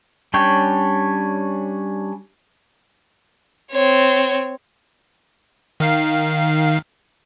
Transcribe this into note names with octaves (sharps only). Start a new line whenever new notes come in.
G3 C#4 D4 C#5 G5
C4 C#5
D#3 F5 C7